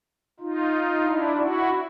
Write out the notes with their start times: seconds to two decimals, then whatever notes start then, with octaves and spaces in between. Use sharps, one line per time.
0.39 D#4 F4
1.04 D4 E4
1.36 E4 F#4